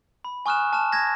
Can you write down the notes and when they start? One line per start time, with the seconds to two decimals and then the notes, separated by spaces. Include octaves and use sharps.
0.25 B5
0.46 G#5 C#6 D#6 F6 F#6 E7
0.73 A5 F6 E7
0.92 G#6 A#6